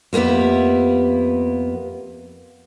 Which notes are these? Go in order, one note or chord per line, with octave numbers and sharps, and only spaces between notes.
F2 A#3 B3 G4 E5